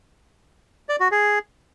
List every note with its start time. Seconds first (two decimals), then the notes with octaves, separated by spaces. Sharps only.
0.89 D5
1.00 F#4
1.11 G#4